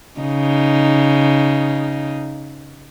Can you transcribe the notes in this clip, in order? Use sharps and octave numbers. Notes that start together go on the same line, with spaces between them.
C#3 D#4